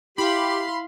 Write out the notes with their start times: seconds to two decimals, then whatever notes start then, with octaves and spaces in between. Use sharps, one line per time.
0.18 E4 G4 F5 B5 C6